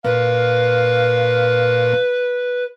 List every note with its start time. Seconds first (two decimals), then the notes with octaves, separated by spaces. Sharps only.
0.04 A#2 B4 F5